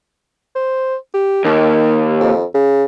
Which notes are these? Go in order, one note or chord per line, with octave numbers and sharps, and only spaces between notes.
C5
G4
D#2 D#3
F2
C#3